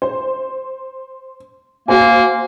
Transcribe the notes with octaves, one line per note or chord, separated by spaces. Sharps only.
C5
A#3 F#4 C5 G#5